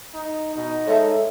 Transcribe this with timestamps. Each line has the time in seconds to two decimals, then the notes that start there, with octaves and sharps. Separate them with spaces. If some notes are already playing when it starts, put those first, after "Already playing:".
0.14 D#4
0.56 B2 D#4
0.87 G#3 A4 C#5 E5